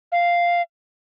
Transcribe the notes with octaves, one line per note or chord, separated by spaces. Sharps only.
F5